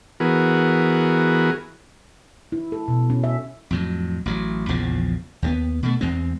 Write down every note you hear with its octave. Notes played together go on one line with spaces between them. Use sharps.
E3 B3 F#4 G#4 A#4
E4
A4
B2
C#4
E5
F2 A2 F#3
A1 F#3
A#1 E2 C#3 F3
D#2 A3 B3
B2 A3
E2 G#3 C4